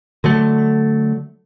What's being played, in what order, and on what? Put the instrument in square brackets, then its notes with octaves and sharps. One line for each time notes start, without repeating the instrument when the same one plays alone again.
[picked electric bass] D3 F#3 A3